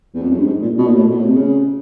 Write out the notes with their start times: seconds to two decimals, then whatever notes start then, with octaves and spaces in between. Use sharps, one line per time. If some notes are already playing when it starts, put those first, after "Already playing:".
0.14 E2
0.22 F2
0.30 F#2
0.38 G2
0.47 G#2
0.62 A#2
0.78 B2
0.86 A#2
0.95 A2
1.03 A#2
1.10 B2
1.18 A2
1.27 C3
1.36 C#3